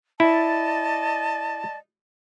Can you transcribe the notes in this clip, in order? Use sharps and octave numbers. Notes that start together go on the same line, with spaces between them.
E4 D5 D#5 A5